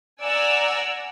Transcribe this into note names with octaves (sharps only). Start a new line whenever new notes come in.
D5 F#5 G#5 A#5 E6